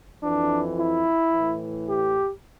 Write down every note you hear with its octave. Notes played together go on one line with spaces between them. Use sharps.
F2 E3 D4
E4
A2 E3
G4